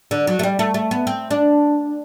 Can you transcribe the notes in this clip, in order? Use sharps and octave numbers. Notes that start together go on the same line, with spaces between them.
D3
F#3
A3
G3
A3
A3
B3
C4
D4